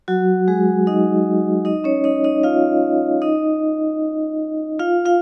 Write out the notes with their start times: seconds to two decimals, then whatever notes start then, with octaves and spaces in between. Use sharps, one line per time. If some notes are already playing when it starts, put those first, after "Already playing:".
0.08 F#3 F#4
0.48 G#3 G#4
0.87 D#4 D#5
1.65 D#4 D#5
1.84 C#4 C#5
2.04 D#4 D#5
2.24 D#4 D#5
2.43 F4 F5
3.22 D#4 D#5
4.80 F4 F5
5.05 F4 F5